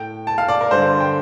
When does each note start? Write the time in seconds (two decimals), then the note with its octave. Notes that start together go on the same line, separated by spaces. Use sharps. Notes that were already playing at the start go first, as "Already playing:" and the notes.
Already playing: A2 G5
0.27 A5
0.38 F5
0.48 D5
0.61 A#4
0.71 G2 D3 C5
1.00 G5